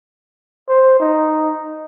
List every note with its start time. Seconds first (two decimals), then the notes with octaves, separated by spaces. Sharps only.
0.69 C5
1.00 D#4